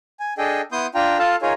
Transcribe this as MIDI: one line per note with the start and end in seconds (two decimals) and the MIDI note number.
0.20 0.34 80
0.38 0.61 62
0.38 0.61 68
0.38 0.61 69
0.38 0.61 75
0.38 0.61 79
0.72 0.87 59
0.72 0.87 64
0.72 0.87 84
0.72 0.87 87
0.72 0.87 91
0.95 1.18 62
0.95 1.18 65
0.95 1.18 79
0.95 1.18 82
1.19 1.36 65
1.19 1.36 69
1.19 1.36 77
1.19 1.36 81
1.42 1.53 63
1.42 1.53 65
1.42 1.53 68
1.42 1.53 70
1.42 1.53 73